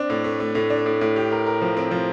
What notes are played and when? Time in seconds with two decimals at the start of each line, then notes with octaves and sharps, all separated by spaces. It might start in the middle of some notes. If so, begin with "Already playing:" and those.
Already playing: C4 D4
0.10 A2
0.24 A3
0.40 A3
0.55 A2
0.70 D4
0.86 A2
1.01 A2
1.16 G4
1.32 A#4
1.46 A#4
1.62 F3
1.77 C4
1.91 F3